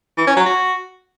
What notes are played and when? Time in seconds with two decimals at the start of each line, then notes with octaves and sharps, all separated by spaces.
0.18 E3
0.27 C#4
0.36 F#3
0.46 F#4